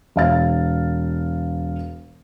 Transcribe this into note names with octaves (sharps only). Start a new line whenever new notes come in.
E1 F5 A6